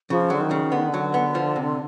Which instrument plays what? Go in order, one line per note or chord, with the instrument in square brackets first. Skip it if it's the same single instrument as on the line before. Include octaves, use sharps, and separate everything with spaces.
[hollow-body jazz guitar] C#3 [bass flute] F3
[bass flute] D3 [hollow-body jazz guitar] F#3
[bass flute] D#3
[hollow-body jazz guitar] C#3
[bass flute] D3 [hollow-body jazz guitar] B3
[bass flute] D#3
D3
[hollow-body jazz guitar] F#3
B3
F3
C3